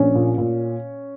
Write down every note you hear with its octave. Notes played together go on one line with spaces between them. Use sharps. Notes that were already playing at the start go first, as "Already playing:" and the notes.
Already playing: A#1 C#4 C#5
A#2
A#2